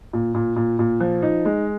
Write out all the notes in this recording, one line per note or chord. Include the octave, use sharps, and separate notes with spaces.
A#2
A#2
A#2
A#2
F3
D#4
G#3